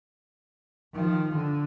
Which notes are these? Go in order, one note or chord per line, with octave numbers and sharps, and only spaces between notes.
D#3 F3
D3